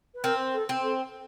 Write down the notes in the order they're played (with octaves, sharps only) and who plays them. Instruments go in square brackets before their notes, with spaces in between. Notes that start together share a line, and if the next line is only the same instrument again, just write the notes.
[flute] B4
[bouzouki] C4 [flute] A#4
[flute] A4
[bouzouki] C4
[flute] A4